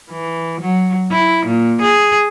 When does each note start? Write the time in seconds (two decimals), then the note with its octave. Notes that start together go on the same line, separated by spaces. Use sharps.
0.10 E3
0.61 F#3
1.12 E4
1.46 A#2
1.81 G#4